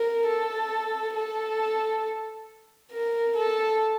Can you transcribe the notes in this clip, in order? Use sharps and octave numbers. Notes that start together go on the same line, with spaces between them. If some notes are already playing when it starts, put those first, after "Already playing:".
Already playing: A#4
A4
A4
A#4
A4